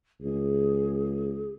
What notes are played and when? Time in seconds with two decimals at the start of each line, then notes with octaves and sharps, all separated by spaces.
0.21 C#2 G#4